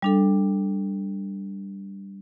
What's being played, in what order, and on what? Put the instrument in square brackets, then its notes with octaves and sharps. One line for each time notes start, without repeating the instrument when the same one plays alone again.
[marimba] G3 D4 A4